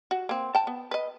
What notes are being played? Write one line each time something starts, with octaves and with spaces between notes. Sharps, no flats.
F#4
A#3 C4
G5 A5
B3
B4 D#5